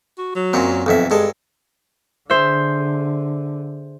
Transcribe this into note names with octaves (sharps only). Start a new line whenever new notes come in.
F#4
F#3
F#2 A#2 C4
B1 F2 E5
G2 G#3 A4
D3 G#4 C5 E5